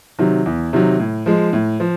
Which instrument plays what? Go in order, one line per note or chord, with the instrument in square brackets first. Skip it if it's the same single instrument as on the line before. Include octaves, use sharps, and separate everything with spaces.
[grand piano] C3 D#3 F#3
E2
C3 D#3 F#3
A2
F3 G#3
A2
F3